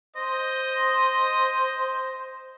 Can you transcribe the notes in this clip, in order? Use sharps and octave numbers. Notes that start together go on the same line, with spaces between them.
C5 D#5